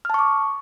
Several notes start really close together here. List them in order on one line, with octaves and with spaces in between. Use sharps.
F6 A5 C#6 D6